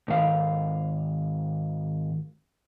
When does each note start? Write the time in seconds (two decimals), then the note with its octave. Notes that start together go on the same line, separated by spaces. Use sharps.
0.08 G#2 D#3 F5